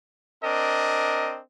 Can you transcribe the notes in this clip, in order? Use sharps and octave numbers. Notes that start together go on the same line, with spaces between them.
C4 D4 A#4 D#5